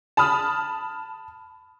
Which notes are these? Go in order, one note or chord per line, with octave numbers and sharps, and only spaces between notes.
A5 B5 D#6 F6